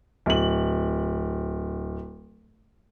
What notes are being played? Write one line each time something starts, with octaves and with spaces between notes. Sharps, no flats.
D1 F#7